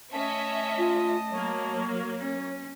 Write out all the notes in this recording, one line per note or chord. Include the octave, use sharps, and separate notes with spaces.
A3 C#4 D#5 E5 A5
F4
F#3 A#3 C#5
C#4